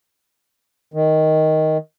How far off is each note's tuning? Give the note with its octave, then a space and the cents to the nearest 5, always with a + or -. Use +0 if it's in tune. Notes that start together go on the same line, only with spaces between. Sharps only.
D#3 +5